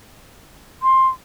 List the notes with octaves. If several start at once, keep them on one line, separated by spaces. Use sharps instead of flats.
C6